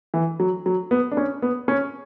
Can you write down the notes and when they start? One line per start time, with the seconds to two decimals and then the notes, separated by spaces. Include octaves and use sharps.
0.14 E3
0.40 F#3
0.66 F#3
0.91 B3
1.11 D4
1.17 C#4
1.42 B3
1.68 C#4